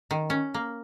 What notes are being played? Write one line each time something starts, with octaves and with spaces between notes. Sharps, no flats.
D#3
C#4
A#3